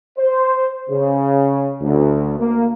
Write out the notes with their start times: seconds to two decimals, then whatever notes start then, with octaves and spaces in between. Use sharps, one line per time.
0.18 C5
0.90 C#3
1.81 D2
2.39 A#3